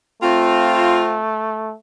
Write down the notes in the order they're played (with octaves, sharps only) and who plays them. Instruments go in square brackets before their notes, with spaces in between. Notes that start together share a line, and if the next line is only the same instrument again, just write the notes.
[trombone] A3 [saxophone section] C4 F4